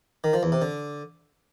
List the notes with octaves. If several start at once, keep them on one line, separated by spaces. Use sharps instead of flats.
D#3
F3
E2
C3
D3